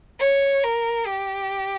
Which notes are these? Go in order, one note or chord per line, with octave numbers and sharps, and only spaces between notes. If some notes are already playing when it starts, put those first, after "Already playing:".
C#5
A#4
G4